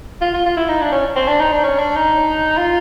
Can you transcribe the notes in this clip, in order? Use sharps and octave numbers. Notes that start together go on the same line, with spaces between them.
F4
F4
F4
E4
D#4
D4
C#4
C4
D4
D#4
D4
C#4
D4
D#4
F4